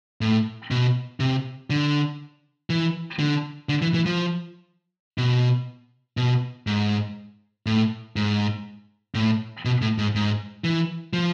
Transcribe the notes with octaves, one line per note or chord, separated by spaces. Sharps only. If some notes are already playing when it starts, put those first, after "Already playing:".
A2
B2
C3
D3
E3
D3
D3
E3
E3
F3
B2
B2
G#2
A2
G#2
A2
B2
A2
G#2
G#2
E3
F3